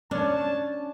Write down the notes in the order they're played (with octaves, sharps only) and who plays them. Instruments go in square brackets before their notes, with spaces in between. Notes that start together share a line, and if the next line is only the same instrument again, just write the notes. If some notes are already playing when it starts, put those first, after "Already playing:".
[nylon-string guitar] C#4 [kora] D4 C#5 [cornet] A5